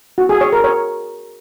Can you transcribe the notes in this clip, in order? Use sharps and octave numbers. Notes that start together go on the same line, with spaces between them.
F#4
G#4
C#5
A#4
C#5